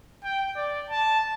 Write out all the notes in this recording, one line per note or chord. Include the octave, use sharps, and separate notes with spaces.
G5
D5
A5